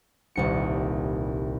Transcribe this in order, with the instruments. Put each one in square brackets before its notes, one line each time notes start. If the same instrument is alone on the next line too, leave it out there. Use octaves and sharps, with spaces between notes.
[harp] D#1 C2 C#7